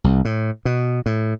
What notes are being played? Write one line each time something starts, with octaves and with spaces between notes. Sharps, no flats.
C2
A2
B2
A2